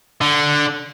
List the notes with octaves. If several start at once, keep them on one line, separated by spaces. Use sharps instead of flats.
D3